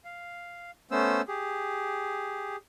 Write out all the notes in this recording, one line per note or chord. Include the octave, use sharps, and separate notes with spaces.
F5
A3 B3 C#4 C5 E6
G4 G#4